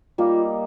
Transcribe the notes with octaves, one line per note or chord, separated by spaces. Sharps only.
G3 A#3 D#4 F4